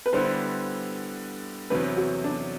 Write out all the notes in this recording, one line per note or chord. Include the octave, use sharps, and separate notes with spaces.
B4
D3 G3 B3 E4 C5
E2 C3 F#3 B4
F#4
D4